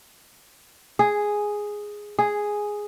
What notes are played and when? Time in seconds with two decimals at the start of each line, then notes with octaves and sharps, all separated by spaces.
0.99 G#4
2.19 G#4